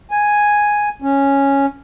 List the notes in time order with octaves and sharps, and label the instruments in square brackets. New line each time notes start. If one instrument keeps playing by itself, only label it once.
[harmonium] G#5
C#4